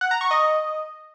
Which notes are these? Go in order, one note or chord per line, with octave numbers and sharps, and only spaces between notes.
F#5
A#5
C#6
D#5